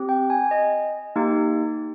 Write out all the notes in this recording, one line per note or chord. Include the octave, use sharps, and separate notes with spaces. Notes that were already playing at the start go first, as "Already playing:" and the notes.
Already playing: C4 G4
G5
G#5
D#5
A#3 D#4 G4